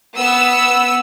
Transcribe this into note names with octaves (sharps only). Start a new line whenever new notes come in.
B3 E6